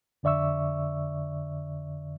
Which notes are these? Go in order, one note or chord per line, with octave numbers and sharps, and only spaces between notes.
F2 D3 D5 E5 C#6 E6